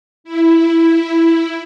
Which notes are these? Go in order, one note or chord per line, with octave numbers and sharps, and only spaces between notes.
E4